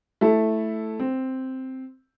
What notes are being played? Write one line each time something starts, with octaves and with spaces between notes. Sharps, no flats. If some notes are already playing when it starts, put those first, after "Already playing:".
A3 E4 A4
C4